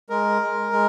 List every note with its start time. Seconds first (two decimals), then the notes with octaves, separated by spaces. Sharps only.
0.10 G#3 A#4
0.42 G#3
0.73 G#3